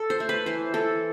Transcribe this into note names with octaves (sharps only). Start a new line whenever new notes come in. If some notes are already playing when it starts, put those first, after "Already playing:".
Already playing: A4
C5
A3
B4
E3 C5
E3 A4